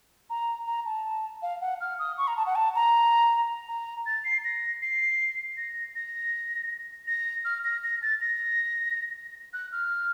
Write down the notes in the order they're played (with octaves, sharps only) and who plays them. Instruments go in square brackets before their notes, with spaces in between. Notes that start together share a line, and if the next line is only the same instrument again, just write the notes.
[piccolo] A#5
A#5
A5
F5
F#5
F6
D#6
C#6
A#5
A5
F#5
A5
A#5
A#5
A6
C7
A#6
C7
A#6
A#6
A#6
F6
A#6
A#6
A6
A#6
F#6
F6